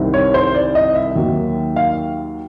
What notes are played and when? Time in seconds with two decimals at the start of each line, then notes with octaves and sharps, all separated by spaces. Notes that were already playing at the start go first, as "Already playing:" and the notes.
Already playing: C2 C3 D#3
0.14 C#5
0.34 C5
0.55 D5
0.75 D#5
0.95 E5
1.16 D#2 D#3 F#3 A#3
1.76 F5